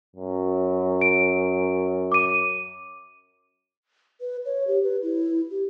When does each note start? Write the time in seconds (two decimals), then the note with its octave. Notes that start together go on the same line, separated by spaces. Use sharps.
0.16 F#2
1.01 D7
2.12 D6 D#7
4.21 B4
4.45 C#5
4.67 G4
4.83 B4
5.02 E4
5.51 G4